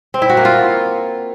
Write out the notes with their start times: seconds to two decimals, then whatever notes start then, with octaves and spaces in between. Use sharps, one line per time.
0.14 C4
0.22 E4
0.29 F#4
0.37 A#3
0.45 F4